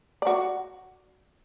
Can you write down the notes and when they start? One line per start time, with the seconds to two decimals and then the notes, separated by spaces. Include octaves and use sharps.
0.22 F#4 D5